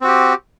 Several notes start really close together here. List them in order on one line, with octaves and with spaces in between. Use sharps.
C4 F#4 G4